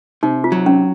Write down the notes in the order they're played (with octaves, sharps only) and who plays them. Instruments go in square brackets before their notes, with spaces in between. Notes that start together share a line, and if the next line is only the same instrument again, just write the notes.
[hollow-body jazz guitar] C3 [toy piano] D#4
[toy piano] F4
[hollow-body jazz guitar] F#3
[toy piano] C#4